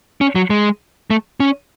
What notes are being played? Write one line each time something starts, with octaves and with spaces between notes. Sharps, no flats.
C#4
F#3
G#3
A3
C#4